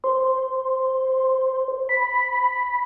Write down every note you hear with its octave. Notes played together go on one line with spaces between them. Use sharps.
C5
B5